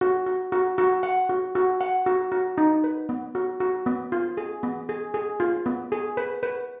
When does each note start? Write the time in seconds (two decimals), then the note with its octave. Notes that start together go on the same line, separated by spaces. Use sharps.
0.01 F#4
0.26 F#4
0.52 F#4
0.78 F#4
1.03 F#5
1.29 F#4
1.55 F#4
1.81 F#5
2.06 F#4
2.32 F#4
2.58 D#4
2.84 B4
3.09 B3
3.35 F#4
3.60 F#4
3.86 B3
4.12 F4
4.37 G#4
4.63 B3
4.89 G#4
5.14 G#4
5.40 F4
5.66 B3
5.92 G#4
6.17 B4
6.43 B4